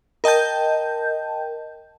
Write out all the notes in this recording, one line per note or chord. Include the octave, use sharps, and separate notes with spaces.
A#4 D#5 G5 A5 G6